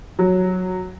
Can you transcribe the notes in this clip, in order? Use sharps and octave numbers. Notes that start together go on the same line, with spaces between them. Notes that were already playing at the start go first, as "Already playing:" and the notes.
F#3